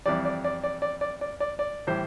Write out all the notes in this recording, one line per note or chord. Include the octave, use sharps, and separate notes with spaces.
F2 E3 G3 D5
D5
D5
D5
D5
D5
D5
D5
D5
A2 E3 G3 C5